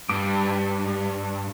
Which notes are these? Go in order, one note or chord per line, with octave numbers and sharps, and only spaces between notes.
G2 G3 D6